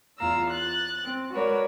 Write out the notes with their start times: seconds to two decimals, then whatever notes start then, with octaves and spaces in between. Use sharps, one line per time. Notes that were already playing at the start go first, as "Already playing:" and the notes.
0.18 E2 F4 F5 A#5 E6
0.51 F#6 A6
1.02 C4
1.32 G#3 F#4 A#4 B4 C#5 D5